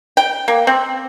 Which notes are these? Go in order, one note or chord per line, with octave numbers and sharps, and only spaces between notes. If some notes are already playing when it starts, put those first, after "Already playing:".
G5
A#3
C4